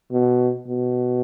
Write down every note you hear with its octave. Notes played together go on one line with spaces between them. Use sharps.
B2
B2